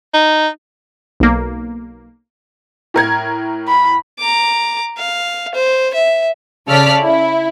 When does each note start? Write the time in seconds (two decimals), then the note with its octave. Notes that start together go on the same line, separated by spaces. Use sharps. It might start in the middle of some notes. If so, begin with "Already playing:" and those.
0.14 D#4
1.20 B1 A#3
2.94 A2 A#4 G#6
3.68 B5
4.19 A#5 D6
4.98 F5
5.55 C5
5.94 E5
6.67 C#3 A4 D5 F6 B6
7.01 E4